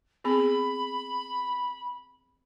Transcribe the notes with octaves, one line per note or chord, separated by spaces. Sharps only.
B3 C4 G#4 B5